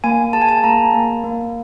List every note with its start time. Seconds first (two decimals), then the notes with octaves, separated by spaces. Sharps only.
0.04 A#3 G#5
0.33 G#4 A5
0.42 G#5
0.49 A5
0.64 A#3 A#5
0.94 A#3
1.24 A#3